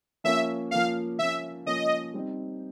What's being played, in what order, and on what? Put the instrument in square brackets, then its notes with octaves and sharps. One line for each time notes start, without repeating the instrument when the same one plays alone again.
[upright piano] F3 A#3 C#4 [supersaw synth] E5
[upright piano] F3 A#3 C#4 [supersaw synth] F5
[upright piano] F3 A#3 C#4 [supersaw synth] E5
[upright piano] F3 A#3 C#4 [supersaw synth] D#5
[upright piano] G3 C4 D#4